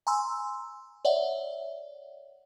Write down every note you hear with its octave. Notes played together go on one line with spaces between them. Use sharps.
G#5 A#5 C6 E6
C#5 D5 E5 F#5